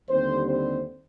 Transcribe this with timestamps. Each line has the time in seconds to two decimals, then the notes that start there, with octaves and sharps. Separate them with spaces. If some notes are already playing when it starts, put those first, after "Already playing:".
0.09 D#2 D3 G3 C4 C5
0.46 C4 C5